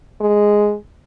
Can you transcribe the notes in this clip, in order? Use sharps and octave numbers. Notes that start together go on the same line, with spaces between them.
G#3